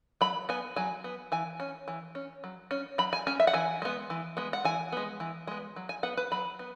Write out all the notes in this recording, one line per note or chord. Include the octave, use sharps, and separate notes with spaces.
F#3 B5
B3 G#5
F#3 G#5
B3
E3 G#5
C#4
E3
C#4
F#3
C#4
F#3 B5
G#5
C#4 G#5
E5
F#5
E3 G#5
G#3 B3
E3
G#3 B3
F#5
E3 G#5
G#3 B3
E3
G#3 B3
F#3
G#5
B3 F#5
B4
F#3 B5
B3